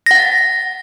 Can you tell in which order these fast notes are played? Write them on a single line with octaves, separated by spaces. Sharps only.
A#6 F#5 A6